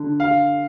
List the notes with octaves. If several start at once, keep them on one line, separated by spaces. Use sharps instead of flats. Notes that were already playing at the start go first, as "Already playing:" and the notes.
Already playing: D3
F5